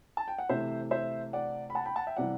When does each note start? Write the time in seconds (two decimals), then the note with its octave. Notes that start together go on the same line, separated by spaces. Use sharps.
0.17 A5
0.28 G5
0.38 F#5
0.49 C3 E3 A3 C5 E5
0.91 C5 E5
1.33 D5 F#5
1.70 B5
1.75 F#5 A5
1.85 G5 B5
1.96 F#5 A5
2.07 E5 G5
2.17 C3 E3 G3 D5 F#5